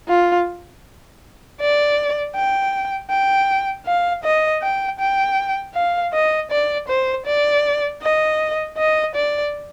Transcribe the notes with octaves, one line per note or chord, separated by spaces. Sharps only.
F4
D5
G5
G5
F5
D#5
G5
G5
F5
D#5
D5
C5
D5
D#5
D#5
D5